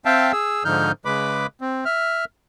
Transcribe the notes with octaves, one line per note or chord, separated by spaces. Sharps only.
C4 E5 F5 G5 A5
G#4 E6
G#2 D3 F3 D#4 F6 G6
C#3 G#3 B4 B5 D6
C4
E5 F6